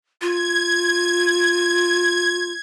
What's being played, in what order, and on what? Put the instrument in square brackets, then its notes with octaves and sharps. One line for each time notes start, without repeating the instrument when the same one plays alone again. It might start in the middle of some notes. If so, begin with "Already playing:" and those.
[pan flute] F4 [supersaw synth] G#6